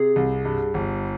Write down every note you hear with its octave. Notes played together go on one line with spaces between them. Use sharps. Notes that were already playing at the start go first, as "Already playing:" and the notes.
Already playing: C3 G#4
C2
G2
G1